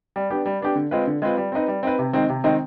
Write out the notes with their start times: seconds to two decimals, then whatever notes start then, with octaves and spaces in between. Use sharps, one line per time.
0.16 G3
0.30 B3 D4 G4
0.46 G3
0.61 B3 D4 G4
0.76 D3
0.91 G#3 C4 F4 B4
1.07 D3
1.22 G#3 C4 F4 B4
1.37 G3
1.52 C4 D#4 B4
1.68 G3
1.83 C4 D#4 B4
1.99 C3
2.13 D#3 G#3 C4 D#4
2.29 C3
2.44 D#3 G#3 C4 D#4